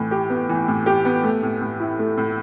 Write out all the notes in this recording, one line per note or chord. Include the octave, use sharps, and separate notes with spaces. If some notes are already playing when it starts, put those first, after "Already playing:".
Already playing: A2 E3
G4
B3
E3
A2
G4
B3
A3
A2
A2
E4
A3
A2